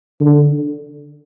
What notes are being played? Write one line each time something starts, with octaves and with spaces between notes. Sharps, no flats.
D3